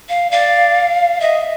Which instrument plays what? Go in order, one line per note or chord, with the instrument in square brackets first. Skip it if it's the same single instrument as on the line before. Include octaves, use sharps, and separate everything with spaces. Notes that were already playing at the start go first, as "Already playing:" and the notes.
[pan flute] F5
[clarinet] D5 [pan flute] F5
[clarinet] D#5 [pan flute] E5